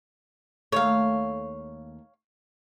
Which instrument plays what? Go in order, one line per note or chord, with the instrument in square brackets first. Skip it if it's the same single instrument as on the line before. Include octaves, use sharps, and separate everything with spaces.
[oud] D#2 A3 [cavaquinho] C#5 F5